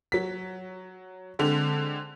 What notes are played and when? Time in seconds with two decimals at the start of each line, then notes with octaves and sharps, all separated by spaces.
0.12 F#3 B6
1.39 D3 G#3 C4